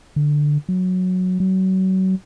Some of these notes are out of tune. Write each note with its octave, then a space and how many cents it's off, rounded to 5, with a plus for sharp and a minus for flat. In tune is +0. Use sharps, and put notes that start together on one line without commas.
D3 +5
F#3 -10
F#3 +30